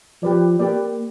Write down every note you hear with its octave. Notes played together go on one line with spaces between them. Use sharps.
F3 G4 B4 D5
A#3 G4 B4 D5